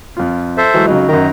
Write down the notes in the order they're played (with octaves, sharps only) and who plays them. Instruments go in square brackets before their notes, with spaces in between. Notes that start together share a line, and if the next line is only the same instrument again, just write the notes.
[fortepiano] F2 F4
[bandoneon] A4 C5 E5
[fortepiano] E3 F#3 G#3
[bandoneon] F2 [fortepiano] C#3 F#3 D#4
[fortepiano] F#2 D#3 [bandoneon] A#5